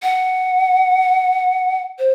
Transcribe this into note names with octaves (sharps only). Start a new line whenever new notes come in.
F#5
C5